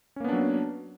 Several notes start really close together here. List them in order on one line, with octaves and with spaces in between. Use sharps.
C#4 A#3 B3 D4 F#3